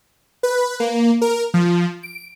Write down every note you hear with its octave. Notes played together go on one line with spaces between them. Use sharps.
B4
A#3
A#4
F3
D7